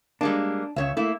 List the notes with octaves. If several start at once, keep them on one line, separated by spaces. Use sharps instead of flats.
G3 G#3 A#3 D4
C#2 C#3 C#5 E5
A3 A#3 E4